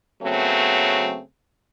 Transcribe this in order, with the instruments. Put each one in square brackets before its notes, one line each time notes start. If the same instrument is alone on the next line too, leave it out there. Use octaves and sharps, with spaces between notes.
[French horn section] C#3 F#3 A3 B3 C4